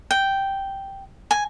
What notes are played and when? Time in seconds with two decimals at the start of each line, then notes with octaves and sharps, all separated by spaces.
0.11 G5
1.31 G#5